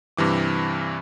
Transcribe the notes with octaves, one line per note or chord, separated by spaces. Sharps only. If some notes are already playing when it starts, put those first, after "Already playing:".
G2 C3 E3 D6